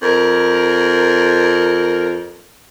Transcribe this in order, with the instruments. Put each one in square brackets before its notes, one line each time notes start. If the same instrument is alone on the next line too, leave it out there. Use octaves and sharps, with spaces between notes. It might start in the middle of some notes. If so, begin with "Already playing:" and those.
[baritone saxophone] F2 [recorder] A#4